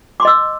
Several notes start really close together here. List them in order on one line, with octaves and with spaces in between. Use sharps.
D6 C6 D#5 E6